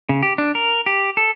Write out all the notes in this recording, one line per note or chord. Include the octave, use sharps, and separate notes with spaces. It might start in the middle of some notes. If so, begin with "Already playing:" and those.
C#3
G4
D4
A#4
G4
A4